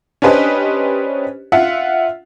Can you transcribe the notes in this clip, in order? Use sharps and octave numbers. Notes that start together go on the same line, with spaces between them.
C#4 D4 G4 B4 C5 D#5
F4 E5 F#5